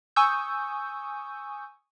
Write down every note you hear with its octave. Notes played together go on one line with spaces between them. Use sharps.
G#5 C#6 D#6 E6 G6